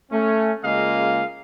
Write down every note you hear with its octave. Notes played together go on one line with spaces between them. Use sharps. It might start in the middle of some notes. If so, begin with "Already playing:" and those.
A3 C#4
C#3 G#3 A#3 F4 D#5 F5